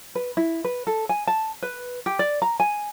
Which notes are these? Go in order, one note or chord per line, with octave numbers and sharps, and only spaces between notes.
B4
E4
B4
A4
G#5
A5
B4
G4
D5
A#5
G#5